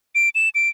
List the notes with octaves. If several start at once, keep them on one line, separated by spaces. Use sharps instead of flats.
D7
E7
D7